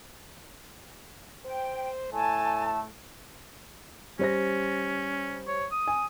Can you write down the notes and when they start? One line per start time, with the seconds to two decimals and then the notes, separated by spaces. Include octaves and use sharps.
1.45 C5 G5
2.13 A2 A3 G#5 A5
4.19 G3 C#4 C5 A#6
5.47 C#5
5.72 D#6
5.87 G#5